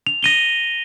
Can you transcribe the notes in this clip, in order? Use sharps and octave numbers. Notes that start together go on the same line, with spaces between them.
F7
A#6 D#7 G7